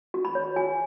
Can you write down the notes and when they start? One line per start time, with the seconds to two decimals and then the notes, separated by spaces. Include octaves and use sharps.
0.14 F#4
0.25 B5
0.35 C#5
0.56 F#4 G#5